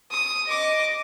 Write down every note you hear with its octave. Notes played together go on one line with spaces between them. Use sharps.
D#6
D#5 D6